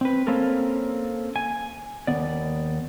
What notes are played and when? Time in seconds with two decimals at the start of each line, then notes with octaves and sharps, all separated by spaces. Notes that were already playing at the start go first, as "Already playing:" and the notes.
0.01 C4 B4
0.27 A#3 C4 C#4 A4 A#4
1.36 G#5
2.07 D#2 B3 D5